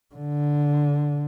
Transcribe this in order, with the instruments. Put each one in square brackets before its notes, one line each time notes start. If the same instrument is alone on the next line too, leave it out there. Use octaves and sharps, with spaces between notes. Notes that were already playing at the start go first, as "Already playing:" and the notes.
[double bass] D3